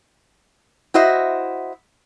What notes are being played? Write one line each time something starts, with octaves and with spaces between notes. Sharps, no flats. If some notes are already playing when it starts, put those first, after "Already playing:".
E4 F#4 C5 D#5 E5